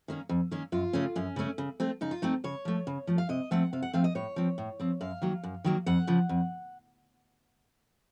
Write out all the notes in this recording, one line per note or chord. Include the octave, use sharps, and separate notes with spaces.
D#3 A#3 C#4
F2
D#3 A#3 C#4
F#2 F4
C#3 A3 C#4
F#2 C#4
C#3 A3 C#4
C#3
A3 C4
C#3 D#4
F4
A3 C4 D#4
C#3 C#5
F3 A3
C#3
F3 A3
F5
C3 D#5
F3 A3 C4 F#5
C3 F5
F#5
F3 A3 C4 F5
D#5
A2 C#5
F3 C4
A2
F3 C4
F#2 F5
D#3 F#3 A#3
F#2
D#3 F#3 A#3
F2 F#5
C#3 F3
F2